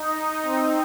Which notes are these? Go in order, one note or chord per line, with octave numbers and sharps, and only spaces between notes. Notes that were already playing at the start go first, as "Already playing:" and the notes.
Already playing: D#4
C4